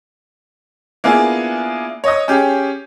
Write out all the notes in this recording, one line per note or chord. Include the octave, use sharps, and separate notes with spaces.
A#3 B3 D4 E4 F4 G#4
C#5 D#5 D#6
C#4 G4 G#4